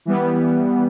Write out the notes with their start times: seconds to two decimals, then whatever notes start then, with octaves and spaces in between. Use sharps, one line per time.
0.05 E3 G3 B3